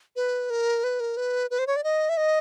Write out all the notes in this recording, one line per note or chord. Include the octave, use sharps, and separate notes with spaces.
B4
A#4
B4
A#4
B4
B4
C5
C#5
D5
D#5
E5
D#5